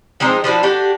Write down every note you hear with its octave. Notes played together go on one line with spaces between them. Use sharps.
F3 G#3 C4 D#4
F3 D4 E4 F#4
A3 D4 F#4 G4